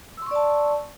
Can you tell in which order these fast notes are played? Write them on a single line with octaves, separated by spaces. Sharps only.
E6 C6 C#6 D5 A5